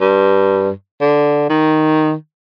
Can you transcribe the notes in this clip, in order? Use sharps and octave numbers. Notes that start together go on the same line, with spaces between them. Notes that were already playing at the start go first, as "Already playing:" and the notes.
G2
D3
D#3